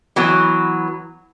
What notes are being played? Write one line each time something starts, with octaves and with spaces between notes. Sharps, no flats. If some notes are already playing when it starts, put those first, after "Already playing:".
E3 F#3 B3